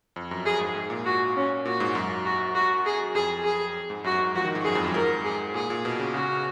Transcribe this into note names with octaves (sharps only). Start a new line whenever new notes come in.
F2
F#2
F#2 G#4
G#2
G#2
A#2
F#4
C#4
A#2 F#4
G#2
F#2
F#4
F#4
G#4
F2 G#4
G#4
G#2
F#2 F#4
G#2
F3 F#4
D#3
G#2
F#2 G#4
F2
F#2
G#2 A#4
G#4
A#2 G#4
A#2
B2
C#3
C#3 F#4